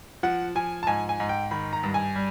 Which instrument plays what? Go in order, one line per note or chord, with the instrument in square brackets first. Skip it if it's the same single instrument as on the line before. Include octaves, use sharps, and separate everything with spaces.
[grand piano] F3 F#5
F3 G#5
A5
G#2 G#5
G#5
G#2
G5
D#3 B5
A#5
G2
G#5
G3